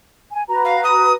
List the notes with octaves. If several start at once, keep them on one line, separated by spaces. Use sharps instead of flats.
G#5
F#4 B4 A#5
F5
D#6